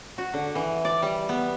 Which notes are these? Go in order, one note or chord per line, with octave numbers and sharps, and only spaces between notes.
F#4
D3
E3
D5
G3
B3